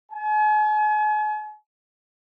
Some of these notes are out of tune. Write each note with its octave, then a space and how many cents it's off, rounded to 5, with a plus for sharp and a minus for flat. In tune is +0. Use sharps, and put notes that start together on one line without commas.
G#5 +40